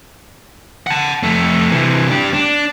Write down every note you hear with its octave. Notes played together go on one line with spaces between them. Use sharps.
F#5 A5
F2 A3
C3 E3
D4 G4
D4